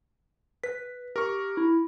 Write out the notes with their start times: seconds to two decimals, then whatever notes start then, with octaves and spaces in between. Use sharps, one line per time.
0.63 B4 B6
1.16 G4 A#4 C#6
1.57 E4